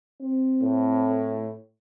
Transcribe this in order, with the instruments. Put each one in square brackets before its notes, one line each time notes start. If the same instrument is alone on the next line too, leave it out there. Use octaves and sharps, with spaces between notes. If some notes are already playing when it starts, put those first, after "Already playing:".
[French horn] C4
[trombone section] A2